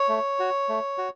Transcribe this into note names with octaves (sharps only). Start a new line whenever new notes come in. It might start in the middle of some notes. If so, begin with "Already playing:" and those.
Already playing: C#5
A3
F#4
A3
F#4